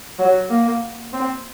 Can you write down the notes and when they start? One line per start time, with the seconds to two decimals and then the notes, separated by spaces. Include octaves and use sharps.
0.19 F#3
0.50 A#3
1.13 C4